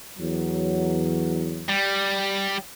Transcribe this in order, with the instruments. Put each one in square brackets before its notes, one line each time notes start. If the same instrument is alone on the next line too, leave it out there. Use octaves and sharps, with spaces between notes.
[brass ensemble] E2 F#3
[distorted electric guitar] G3